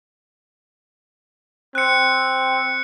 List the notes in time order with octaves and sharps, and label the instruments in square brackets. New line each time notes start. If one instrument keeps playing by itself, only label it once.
[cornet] C4 [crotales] F#6 C#7